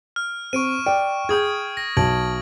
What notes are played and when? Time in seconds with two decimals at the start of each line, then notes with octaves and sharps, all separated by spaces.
0.16 F6
0.53 C4 C#6 D7 D#7
0.86 D5 G5 D7
1.29 G#4 D#6 G6 G#6
1.77 A#6
1.97 B1 A5 G#6 D7 F#7